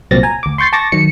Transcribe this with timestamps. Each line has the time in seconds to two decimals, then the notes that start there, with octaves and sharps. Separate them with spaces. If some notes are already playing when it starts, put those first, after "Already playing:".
0.11 C2 A#2 F#3 C4 A6 A#6
0.23 G#5 A#5
0.43 D2 D6
0.58 C6 C#6 G6 A6 C7
0.73 A5 C#6 D6 A6 A#6
0.92 D#3 F#3 C#7